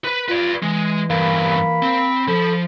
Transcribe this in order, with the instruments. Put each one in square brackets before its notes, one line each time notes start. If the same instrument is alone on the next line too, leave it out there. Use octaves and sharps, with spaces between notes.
[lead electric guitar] B4
[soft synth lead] F4 [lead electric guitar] B4 D5
[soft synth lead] E3 [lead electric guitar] G#3
[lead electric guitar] E2 G2 [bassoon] A#3 [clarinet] B5
[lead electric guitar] C4
[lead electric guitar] F3 [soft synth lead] A4